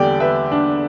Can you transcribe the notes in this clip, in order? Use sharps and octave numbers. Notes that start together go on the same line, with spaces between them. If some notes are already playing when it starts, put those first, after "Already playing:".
Already playing: E2 D3 G3 G4 D5 G5
B4 E5
D4